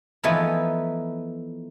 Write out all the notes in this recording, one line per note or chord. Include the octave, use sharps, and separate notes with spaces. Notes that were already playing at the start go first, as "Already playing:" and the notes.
E3 F3 A3 B3 D#4 E4